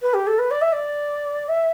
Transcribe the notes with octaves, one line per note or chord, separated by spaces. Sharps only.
B4
G4
A4
B4
D5
E5
D5
E5